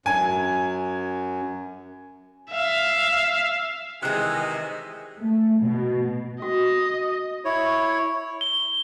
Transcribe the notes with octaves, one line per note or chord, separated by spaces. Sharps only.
F#2 G#5
E5 F5
C3 D#3 E3 G#3 D#5 G#5 F#6
A3
B2
F#4 D#5
E4 C#5
G7